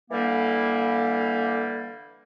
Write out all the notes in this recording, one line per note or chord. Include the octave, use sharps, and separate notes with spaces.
D3 E3 G3 A#3